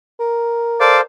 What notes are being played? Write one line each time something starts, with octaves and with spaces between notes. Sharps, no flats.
A#4
A4 C5 D5 F5